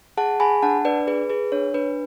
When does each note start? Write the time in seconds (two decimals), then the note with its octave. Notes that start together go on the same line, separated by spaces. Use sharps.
0.17 G#4 F#5 A5
0.40 G#4 G#5 B5
0.62 D4 F#5 A5
0.85 D4 B4 D5
1.07 G#4 B4
1.30 G#4 B4
1.52 D4 C#5
1.74 D4 B4